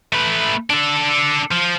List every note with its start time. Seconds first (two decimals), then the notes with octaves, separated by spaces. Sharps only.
0.12 A3 B4
0.70 D4 A4
1.51 F3